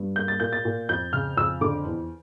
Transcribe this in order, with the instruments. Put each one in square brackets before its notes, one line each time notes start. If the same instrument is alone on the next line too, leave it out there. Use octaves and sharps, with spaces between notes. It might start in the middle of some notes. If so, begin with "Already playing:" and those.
Already playing: [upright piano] G2
A#3 G6
A6
A#2 G6
A6
A#2
F2 G6
C#3 F6
F2 E6
D3 D6
E2